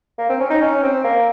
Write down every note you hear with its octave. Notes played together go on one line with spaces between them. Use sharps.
A#3
C4
C#4
D#4
C#4
C4
A#3